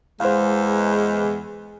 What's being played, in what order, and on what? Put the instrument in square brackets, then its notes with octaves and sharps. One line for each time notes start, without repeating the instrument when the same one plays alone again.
[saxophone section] E2 [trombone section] G#3 [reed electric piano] C5 F5